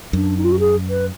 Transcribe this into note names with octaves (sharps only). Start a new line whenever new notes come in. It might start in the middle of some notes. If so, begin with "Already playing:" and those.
F#2 D4
D#4
F4
F#4
G#4
B4